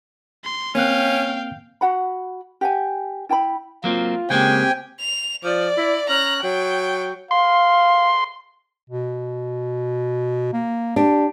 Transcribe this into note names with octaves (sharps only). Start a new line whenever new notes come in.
C6
A#3 C4 C#4 F5 G5 F#6
F#4 F#5 B5
G4 F#5 G#5
E4 G5 A5 B5
F#3 A#3 C4 F4
C#3 G#3 A#3 C4 G4 G5 G#5
F7
F3 D5
E4
C#4 A#5 F#6
F#3 G5
F5 C6
B2
A#3
D4 G4